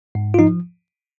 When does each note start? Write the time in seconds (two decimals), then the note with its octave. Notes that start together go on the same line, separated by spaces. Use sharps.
0.15 G#2
0.34 F4
0.39 F3 D#4